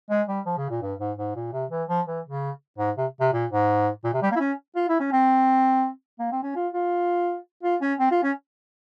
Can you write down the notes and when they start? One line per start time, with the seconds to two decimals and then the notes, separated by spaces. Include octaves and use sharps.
0.10 G#3
0.28 G3
0.46 F3
0.57 C#3
0.70 A#2
0.82 G2
1.00 G#2
1.18 G#2
1.36 A#2
1.53 C3
1.71 E3
1.89 F3
2.07 E3
2.25 C#3
2.78 G#2
2.98 C3
3.20 C3
3.33 A#2
3.51 G#2
4.04 A#2
4.14 C3
4.22 G3
4.32 A#3
4.36 E4
4.40 C#4
4.76 F4
4.89 E4
5.00 C#4
5.12 C4
6.19 A#3
6.32 C4
6.43 C#4
6.55 F4
6.74 F4
7.63 F4
7.81 C#4
7.99 C4
8.11 F4
8.23 C#4